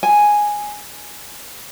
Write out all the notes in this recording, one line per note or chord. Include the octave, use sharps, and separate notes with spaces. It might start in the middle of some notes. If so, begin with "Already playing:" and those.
G#5